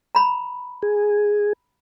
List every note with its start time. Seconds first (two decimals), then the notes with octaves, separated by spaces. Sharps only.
0.15 A#5 B5
0.82 G#4